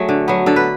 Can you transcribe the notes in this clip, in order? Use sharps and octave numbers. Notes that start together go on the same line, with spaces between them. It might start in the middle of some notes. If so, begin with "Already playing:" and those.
Already playing: F#3 A3 G#4
D3
F#3 B3
D3 A4
B4